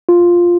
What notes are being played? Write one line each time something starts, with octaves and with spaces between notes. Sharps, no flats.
F4